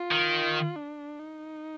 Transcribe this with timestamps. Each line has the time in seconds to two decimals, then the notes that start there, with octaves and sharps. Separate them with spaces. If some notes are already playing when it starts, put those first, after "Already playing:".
Already playing: F4
0.11 D#3
0.76 D4
1.19 D#4